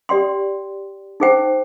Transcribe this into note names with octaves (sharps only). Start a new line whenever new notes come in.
G4 D5 G5 C6
D#4 G#4 C5 G5